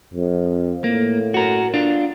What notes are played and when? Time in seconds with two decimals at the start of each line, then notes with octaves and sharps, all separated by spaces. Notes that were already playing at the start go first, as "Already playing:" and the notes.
0.14 F2
0.84 A2 A#3
1.34 F#4 A#4
1.74 D4 F4